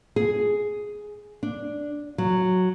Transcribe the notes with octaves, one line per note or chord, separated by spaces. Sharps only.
G#4
D4
F#3